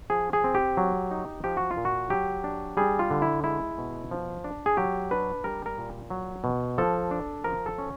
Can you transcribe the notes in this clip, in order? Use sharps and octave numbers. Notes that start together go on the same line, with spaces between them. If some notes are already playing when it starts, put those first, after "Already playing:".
F3 G#4
G#4
C4
G4
F#3
D#4
F3 G4
F#4
F4
A#2
F#4
F#3 G4
D4
G3 G#4
F4
D3
E4
G#3 E4
B2
F3
D4
G#4
F#3 G4
D4 B4
G3 A#4
A#4
A#2
F#3
B2
F3 A4
D4
F3 A#4
A4
C#4